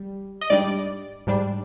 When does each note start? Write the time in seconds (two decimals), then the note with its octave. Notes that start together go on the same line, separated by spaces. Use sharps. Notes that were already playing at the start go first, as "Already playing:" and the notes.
Already playing: G3
0.41 D#5
0.50 G#2 G3 D4 D5
1.27 G#2 G3 D4